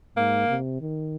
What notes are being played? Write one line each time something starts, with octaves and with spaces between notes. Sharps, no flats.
G#2 A#3
C3
D#3